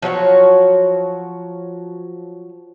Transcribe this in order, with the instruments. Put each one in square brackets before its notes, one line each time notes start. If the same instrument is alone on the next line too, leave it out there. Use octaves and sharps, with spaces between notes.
[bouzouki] F3 F#3 F#4 C#5